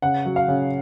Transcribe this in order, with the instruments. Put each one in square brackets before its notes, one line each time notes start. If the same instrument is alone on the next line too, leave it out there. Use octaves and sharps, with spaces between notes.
[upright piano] C#3 F#5
F#3
F5
C#3